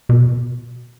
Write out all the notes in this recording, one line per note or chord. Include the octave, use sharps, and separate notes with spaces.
B2